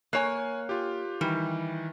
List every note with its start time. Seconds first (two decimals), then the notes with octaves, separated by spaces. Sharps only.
0.13 A#3 C#5 G#5 F#6
0.69 F4 G4
1.21 D#3 E3 G3